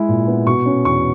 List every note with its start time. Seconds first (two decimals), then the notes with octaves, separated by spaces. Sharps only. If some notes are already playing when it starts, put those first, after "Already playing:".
Already playing: G#3 E4
0.09 A#2
0.28 B3
0.47 B2 C#6
0.66 C#4
0.85 E2 C#6